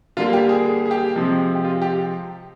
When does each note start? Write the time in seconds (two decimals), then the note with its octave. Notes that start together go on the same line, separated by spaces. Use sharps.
0.17 D3 G3 A#3 F4
0.33 G4
0.49 G#4
0.66 G#4
0.86 G#4
0.91 G4
1.15 C3 F3 G#3
1.55 G4
1.65 F4
1.82 G4